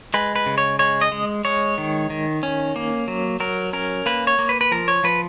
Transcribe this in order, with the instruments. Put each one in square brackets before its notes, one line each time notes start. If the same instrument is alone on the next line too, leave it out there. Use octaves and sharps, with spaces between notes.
[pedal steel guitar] G#3 B4
B4
C#3
C#5
G#3 C#5
D#5
G#3
G#3 C#5
D#3
D#3
C#4
A#3
F#3
F#3 A#4
C#4 A#4
A#3 B4
C#5
A#3
B4
B4
F3 A#4
C#5
F3 B4